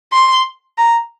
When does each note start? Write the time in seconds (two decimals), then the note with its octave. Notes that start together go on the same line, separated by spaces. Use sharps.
0.13 C6
0.78 A#5